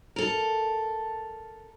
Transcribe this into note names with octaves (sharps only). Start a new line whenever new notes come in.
A4 A#4